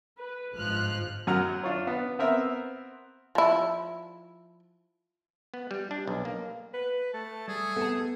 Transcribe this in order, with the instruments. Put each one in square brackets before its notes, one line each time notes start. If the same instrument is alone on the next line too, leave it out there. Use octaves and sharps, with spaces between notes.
[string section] B4
G1 G#2 F3 F6 F#6
[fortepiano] F#2 F#3 F#5 A#5 F6
D4 F4 C#5
B3
B3 C4 A#4 E5
[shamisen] F3 E4
[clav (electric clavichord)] B3
G3
D4
B1
A#3
[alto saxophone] B4
[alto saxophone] A3 [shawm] A5
[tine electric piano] G3 [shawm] G#4
[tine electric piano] B3 [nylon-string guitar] A4 G#5 A5